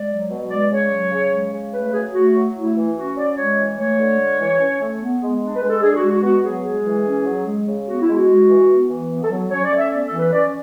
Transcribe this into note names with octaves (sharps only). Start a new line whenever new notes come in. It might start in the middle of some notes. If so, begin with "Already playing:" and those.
Already playing: G#3 D5
F#3
B2
G#3 D5
C#3 C#5
F#3
C#3
G#3
C#3
A3 B4
F#3 G#4
A3 F#4
F#3
A3 E4
E3
C#4 F#4
F#3 D5
G#3 C#5
E3
A3 C#5
D3
G#3
E3
C#4
A3
B3
G#3
D4
B4
G#3
A4
D4 G#4
F#4
G#3
F#4
B3 F#4
F#3 G#4
G#3 G#4
E3
C#4
F#3
G#3
C#3
B3 F#4
E4
G#3
F#4
G#3
E3
B3
E3
B3
A4
F#3
C#4 C#5
D5
A3
E5
B3 D5
A4
E3
B4
C#4 D5